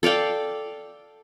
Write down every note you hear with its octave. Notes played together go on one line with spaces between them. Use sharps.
A4 D5 F5 G5